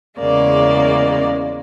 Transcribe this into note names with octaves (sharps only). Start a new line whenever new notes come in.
E2 C#3 G#3 A#3 D5